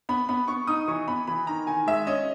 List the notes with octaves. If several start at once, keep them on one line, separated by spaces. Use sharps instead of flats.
B3 B5
B3 B5
B3 C#6
D#4 D#6
E3 C#6
B3 B5
E3 B5
D#3 A#5
D#3 G#5
G#3 E5
C#4 D#5